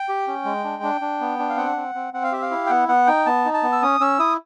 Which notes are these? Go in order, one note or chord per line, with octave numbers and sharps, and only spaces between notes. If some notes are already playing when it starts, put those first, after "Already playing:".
Already playing: G5
G4
C#4
G#3
D4
D4
D4
B3
D4
F5
C4 F#5
C4
C4
C4 F#5
F5
G4 E5
F5
E4
G5
B3 F#5
B3 F#5
D#4 G5
B3 A5
D#4
A5
B3
E6
C#4 D#6
C#4 E6
E4 D#6